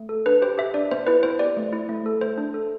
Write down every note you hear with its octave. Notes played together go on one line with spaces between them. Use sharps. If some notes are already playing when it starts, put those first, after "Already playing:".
Already playing: A3
A4
D4 B4
G4 C5
G4 E5
D4 D5
B3 C5
E4 B4
B3 C5
G4 D5
A3
E4
A3
A4
A3 C5
D4
A4